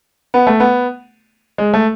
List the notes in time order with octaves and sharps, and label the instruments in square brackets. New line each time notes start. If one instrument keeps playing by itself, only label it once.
[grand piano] B3
A3
B3
G#3
A3